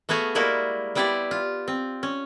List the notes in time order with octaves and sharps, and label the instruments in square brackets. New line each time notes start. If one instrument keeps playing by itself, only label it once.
[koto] A3 B3 F#4 G#4 F5
G3 G#3 A#3 E4 F#4 A#4
G3 B3 E4 G4 C5 D5
F4
C4
C#4